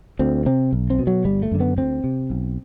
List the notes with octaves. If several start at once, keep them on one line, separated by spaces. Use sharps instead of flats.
D2 C4
C3 C4
B1
C4
B2
F#3
G1 G3
A3
F#2 D3
B3
D2 C4
C3
B1